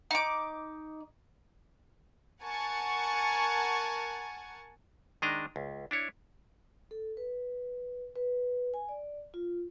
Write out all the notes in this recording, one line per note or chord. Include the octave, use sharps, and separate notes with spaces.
D#4 D6
A#4 F#5 G#5 A5 C#6
D#3 G#3 D4 D#5 A#5
C#2
D4 E4 C#5
A4
B4
B4
G#5
D5
F4